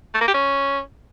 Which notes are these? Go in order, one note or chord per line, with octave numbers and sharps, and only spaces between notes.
A3
A#3
G4
C#4